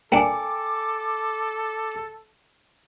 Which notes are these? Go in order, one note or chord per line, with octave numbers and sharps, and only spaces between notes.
A#3 D4 A4 G5 G#5 D6